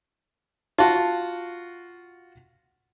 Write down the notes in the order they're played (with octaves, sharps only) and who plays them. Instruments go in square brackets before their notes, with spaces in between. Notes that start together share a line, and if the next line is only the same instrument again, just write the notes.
[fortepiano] F4 F#4 [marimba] A5